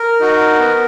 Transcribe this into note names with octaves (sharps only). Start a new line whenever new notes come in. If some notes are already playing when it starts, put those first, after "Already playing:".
Already playing: A#4
D#4 F#4
B3